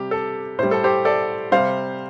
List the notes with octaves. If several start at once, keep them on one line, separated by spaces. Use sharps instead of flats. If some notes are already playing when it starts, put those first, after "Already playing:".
Already playing: C3 G3 G4
A4
A2 G3 C5
A4
G4 C5
A4 D5
C3 G3 C5 F5